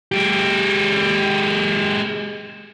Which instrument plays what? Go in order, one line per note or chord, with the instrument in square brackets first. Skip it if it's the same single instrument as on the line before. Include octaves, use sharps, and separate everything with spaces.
[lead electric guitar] G#3 G4